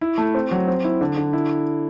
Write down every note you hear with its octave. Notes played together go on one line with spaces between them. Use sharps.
E4
A3
C4
F#3
C4
E4
D3
D3
E4